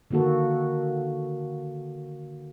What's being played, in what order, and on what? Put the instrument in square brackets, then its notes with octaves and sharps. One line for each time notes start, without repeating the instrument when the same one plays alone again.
[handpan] D3 D#3 A#3 F#4 A4